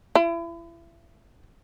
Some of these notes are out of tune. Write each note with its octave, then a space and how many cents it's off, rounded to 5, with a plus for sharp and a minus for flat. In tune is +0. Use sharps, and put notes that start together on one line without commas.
E4 +35